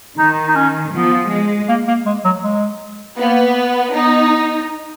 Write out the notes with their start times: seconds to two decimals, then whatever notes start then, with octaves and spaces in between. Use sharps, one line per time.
0.18 D#3 D#4
0.48 D#4
0.56 C#4
0.93 F3 B3
1.30 G#3
1.68 A#3
1.87 A#3
2.06 G#3
2.24 F#3
2.43 G#3
3.18 A#3 B3
3.93 B3 D#4